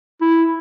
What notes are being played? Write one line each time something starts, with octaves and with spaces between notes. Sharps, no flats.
E4